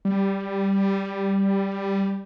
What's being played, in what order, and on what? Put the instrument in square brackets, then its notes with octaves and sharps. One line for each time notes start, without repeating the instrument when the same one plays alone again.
[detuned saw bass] G3